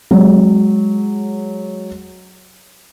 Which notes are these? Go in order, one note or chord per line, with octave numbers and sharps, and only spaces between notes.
F#3 G#3